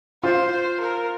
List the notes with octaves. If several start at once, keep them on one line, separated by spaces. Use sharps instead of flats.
F4 C5
C5
A#4